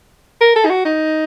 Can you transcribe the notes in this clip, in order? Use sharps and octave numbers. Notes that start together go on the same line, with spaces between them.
A#4
A4
D#4
F#4
D#4